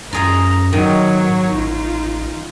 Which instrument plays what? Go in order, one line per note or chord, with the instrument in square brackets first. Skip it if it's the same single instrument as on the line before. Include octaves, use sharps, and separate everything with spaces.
[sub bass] F#2 [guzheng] F4 G#4 F5 [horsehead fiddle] A#5
[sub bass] G#2 [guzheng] D#3 [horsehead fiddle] F#3 C#5
[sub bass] A1 [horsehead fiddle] D#4 F4